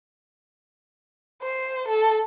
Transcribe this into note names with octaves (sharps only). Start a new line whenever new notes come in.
C5
A4